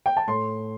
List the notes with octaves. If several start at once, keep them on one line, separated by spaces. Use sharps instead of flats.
G5
A5
A2 C6